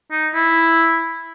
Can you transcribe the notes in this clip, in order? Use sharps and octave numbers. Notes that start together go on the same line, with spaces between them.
D#4
E4